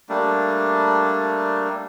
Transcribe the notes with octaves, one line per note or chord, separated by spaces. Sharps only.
G3 A3 A#3 D4